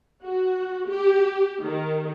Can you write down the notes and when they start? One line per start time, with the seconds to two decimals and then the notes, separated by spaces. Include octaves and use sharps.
0.23 F#4
0.88 G4
1.61 D#3